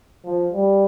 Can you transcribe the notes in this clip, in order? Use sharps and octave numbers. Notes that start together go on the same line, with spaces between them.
F3
G3